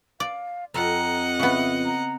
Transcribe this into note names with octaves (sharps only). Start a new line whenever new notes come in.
D5 F5
F2 D#5 F#5 A#5
C#3 B3 E5
A#5